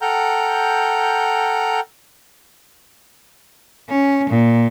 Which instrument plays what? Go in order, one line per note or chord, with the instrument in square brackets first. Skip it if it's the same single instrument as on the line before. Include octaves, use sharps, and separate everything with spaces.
[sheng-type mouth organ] A4 F#5 G5 A#5 F6 G6
[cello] C#4
A#2